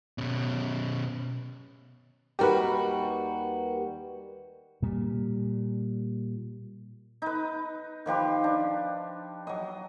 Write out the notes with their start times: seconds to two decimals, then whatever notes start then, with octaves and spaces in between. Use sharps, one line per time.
0.18 B2 C#4
2.39 D#2 G3 F#4 G4 A#4 B4
4.82 A#2 G3
7.22 D#4 B4
8.06 D#3 F3 G4 B4
8.44 D4
9.47 F#3 D#5